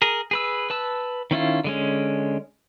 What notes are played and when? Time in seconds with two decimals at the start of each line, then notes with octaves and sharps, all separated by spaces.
0.02 G#4 A#4
0.31 G#4 B4 E6
0.70 B4 A5 E6
1.31 D#3 C#4 E4 F4
1.64 D3 G#3 C#4